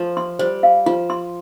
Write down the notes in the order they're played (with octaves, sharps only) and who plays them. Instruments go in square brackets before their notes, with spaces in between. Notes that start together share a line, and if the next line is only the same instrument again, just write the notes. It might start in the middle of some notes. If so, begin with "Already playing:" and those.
Already playing: [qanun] F3 A3
[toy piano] C6
[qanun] G3 [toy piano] C5
[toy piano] F5
[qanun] F3 [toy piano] F4
[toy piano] C6